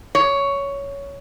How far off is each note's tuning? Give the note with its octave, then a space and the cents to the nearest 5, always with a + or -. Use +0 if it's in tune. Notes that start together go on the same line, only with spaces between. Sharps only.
C#5 +10